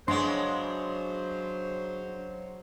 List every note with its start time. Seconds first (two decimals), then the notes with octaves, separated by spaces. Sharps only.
0.08 C#3 F#3 G#3 B3 D4 C5 C6